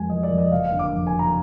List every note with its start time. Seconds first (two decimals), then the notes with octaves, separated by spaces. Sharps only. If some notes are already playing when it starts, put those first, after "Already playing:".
Already playing: F2 F#3 G#3 G#5
0.10 F3 D#5
0.23 D5
0.30 F2
0.38 D#5
0.52 F#1 F5
0.66 F5
0.72 D3
0.79 D6
0.93 F2
1.07 G#5
1.13 F#3
1.19 A#5